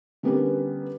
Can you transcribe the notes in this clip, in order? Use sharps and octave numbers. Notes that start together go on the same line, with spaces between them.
D3 G3 B3 C#4 A#4 B4